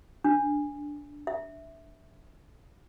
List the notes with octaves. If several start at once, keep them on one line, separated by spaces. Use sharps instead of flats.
D4
E5